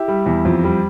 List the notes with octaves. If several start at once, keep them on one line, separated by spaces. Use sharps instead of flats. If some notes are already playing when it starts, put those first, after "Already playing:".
Already playing: E4 G4
G3
E2
F2
G3